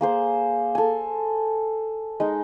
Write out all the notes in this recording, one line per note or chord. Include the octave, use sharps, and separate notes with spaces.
A#3 G#4 C5
A4 G#5
G#3 D#4